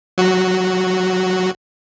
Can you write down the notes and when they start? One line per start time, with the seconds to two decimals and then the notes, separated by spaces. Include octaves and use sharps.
0.18 F#3 F#4